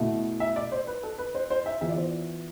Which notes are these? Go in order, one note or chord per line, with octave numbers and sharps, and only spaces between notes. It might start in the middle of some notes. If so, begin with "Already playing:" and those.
Already playing: B2 A3 E4
E5
D5
C5
B4
A4
B4
C5
C5
E5
E3 B3 F4 E5
D5
C5